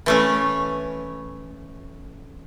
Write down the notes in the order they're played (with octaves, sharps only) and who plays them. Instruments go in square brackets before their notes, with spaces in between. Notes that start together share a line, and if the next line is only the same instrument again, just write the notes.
[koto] E3 A3 C#4